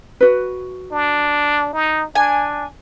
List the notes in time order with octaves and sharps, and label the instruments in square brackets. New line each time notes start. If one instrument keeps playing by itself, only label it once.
[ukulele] F#4 B4
[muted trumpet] D4
D#4
[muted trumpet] D4 [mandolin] G#5